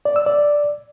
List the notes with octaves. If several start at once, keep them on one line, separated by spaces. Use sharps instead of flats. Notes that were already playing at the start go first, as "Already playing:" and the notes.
D5
E6
D5